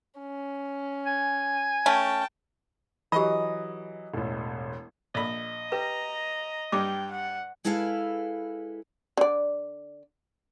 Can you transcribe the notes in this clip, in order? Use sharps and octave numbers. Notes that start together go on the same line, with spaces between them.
C#4
G#5
A3 C#4 G5 A5
E3 F#3 G4 D#5 B5
E1 A1
A#1 D#5 B5
G4 B4 A#5
G2 G3 G5 D6
F#5
G#3 E4 A4 B4 F5
D3 D5